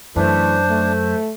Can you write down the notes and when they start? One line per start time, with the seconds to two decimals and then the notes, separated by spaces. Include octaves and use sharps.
0.16 F#2 E3 A3 D4 C5
0.69 A3